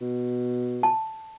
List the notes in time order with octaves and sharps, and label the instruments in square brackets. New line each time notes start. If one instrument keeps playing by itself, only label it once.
[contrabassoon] B2
[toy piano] A5